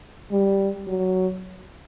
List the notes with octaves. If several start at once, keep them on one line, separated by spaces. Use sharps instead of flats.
G3
F#3